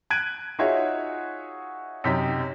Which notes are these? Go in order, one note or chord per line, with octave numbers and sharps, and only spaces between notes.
F#6 G#6 D7 D#7
D#4 F4 F#4 G#4 C#5 E5
F#2 C3 D#4 G4 B6